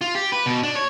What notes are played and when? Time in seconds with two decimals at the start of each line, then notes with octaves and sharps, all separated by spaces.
0.01 F4
0.15 G4
0.32 B4
0.46 B2
0.63 D4
0.75 C#5